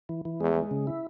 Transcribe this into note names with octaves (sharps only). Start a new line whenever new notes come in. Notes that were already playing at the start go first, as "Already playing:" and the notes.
E3
E3
E2 G#3
G#3
C#3
E4